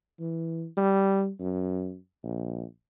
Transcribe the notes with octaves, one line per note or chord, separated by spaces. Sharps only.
E3
G3
F#2
A#1